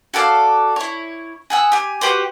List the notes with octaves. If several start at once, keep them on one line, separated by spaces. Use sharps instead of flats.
F#4 A4 D5 F5
E4 C#5
G#4 F#5 E6
G4 G#5
F#4 G4 B4 C5